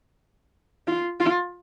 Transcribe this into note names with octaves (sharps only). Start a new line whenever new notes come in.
F4
F4